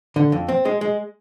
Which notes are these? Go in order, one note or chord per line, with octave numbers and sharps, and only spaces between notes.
D3
F2
C4
G#3
G#3